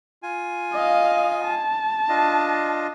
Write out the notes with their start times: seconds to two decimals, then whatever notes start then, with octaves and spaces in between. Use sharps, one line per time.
0.23 F4 G#5
0.73 D#5 F5
1.44 A5
2.09 D4 F4 D#5